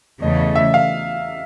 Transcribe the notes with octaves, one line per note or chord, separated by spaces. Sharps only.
E2 C#3 E3 A3 D#5
D#5
E5
F5